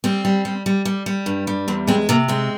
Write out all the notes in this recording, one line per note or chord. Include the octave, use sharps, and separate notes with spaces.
G3 C4
G3
G3
G3
G3
G3
G2
G3
E2 C4
G#3 C4
C3 A#3
G#3 C4